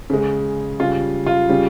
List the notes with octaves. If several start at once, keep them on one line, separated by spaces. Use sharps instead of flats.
C#3 G#3
C#3 G3 F4
F4
C#3 G3